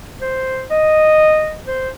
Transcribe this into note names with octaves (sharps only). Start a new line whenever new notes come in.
C5
D#5
C5